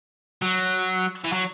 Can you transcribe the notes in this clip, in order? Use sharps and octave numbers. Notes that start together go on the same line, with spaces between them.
F#3
E3
F#3